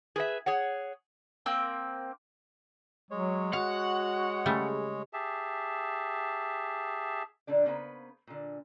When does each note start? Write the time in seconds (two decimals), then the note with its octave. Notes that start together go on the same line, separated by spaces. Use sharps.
0.16 G#4 B4 E5
0.46 G#4 C#5 F#5
1.46 A#3 C4 G5
3.11 F#3 G#3 C#5
3.53 F#4 F5 F#5
4.46 C#3 G3 A3
5.13 G4 G#4 E5 A5
7.47 A#2 D3 D4 D5
7.65 C#3 A#3 B3 A4 B4 C5
8.27 A#2 D3